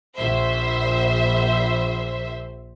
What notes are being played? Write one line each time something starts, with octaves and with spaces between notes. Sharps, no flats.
A#1 C5 E5